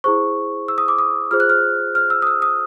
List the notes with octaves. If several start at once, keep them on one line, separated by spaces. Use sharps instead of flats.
E4 G#4 C5 C#6
E6
D#6
D6
D#6
F4 G#4 C5 F6
F#6
F6
F6
E6
D#6
E6
D#6